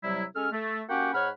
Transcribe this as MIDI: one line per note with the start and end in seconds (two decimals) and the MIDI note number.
0.03 0.24 48
0.03 0.24 54
0.03 0.24 55
0.03 0.24 64
0.34 0.48 56
0.34 0.48 61
0.34 0.48 69
0.34 0.48 89
0.52 0.82 57
0.89 1.12 58
0.89 1.12 61
0.89 1.12 66
0.89 1.12 67
0.89 1.12 78
0.89 1.12 79
1.13 1.29 44
1.13 1.29 73
1.13 1.29 78
1.13 1.29 83
1.13 1.29 89